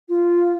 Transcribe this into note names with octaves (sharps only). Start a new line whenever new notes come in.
F4